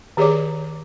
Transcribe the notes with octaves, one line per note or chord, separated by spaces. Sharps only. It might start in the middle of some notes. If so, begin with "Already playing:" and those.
D#3 G4 G#4 C#5 D5 D6